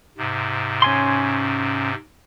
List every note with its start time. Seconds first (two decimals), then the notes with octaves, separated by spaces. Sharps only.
0.18 G#2 C3
0.82 C#4 G#5 C6